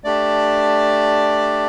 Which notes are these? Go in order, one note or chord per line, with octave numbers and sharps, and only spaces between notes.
A3 D4 G4 D5